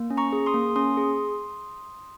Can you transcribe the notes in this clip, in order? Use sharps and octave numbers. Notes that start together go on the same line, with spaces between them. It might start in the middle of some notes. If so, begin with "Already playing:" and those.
Already playing: A#3
C#4
A#5 C#6
G#4
C6 D#6
A#3
C#4 C6 D#6
G#4